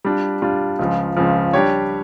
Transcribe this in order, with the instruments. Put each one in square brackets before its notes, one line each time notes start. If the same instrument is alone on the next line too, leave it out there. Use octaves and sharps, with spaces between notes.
[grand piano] G3 D4 F4
G3 D4 F4
C#2 C#3 F3
C#2 C#3 F3
G3 D4 G4 C#5